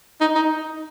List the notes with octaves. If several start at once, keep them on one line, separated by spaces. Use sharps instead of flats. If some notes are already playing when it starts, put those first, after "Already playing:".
D#4
D#4